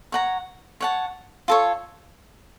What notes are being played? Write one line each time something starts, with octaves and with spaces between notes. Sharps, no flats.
C#5 F#5 A#5
C#5 F#5 A5
F4 A4 C#5